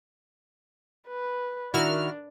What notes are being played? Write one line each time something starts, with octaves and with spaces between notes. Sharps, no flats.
B4
D#3 D4 E4 F#4 F6